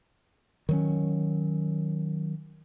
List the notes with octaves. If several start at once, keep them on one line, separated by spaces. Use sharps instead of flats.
D#3 F#3 C#4